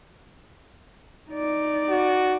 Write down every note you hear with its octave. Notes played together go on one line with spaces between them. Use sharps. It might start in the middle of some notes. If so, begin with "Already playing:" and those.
D#4 D5
F#4